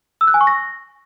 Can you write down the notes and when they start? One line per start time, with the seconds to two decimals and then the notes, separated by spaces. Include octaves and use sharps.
0.21 E6
0.27 F#6
0.34 G#5
0.41 C#6
0.47 A#6